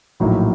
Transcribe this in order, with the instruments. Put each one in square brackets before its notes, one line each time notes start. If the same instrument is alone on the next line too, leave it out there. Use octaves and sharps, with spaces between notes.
[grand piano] A#1 A2 F#3 A#3 D#4